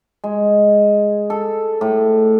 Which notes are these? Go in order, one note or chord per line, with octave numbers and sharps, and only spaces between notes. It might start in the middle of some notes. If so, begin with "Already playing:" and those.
G#3
A4
A2